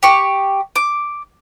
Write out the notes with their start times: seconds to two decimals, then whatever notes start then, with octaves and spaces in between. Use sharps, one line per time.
0.03 G4 C#6
0.76 D6